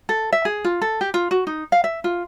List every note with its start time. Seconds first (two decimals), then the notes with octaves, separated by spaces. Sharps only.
0.09 A4
0.33 E5
0.45 G#4
0.64 F4
0.82 A4
1.01 G4
1.14 F4
1.31 F#4
1.47 D#4
1.72 F5
1.84 E5
2.04 F4